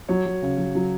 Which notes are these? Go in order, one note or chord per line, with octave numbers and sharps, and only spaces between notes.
F#3 C#5
F#3
C#3
F#3
F#3